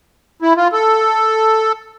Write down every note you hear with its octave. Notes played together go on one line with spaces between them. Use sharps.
E4
F4
A4